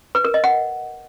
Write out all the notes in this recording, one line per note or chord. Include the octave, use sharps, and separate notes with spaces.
B4
A#4
D#5
F#5